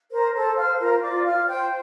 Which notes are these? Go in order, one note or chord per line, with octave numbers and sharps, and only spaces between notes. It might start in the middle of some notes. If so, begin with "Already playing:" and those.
A#4 C5 A#5
A4 C5 A5
C5 F5 F6
F4 A#4 A#5
C6
F4 D5 D6
F4 F5 F6
C5 G5 G6